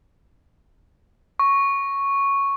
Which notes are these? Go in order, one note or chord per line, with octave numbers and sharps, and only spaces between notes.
C#6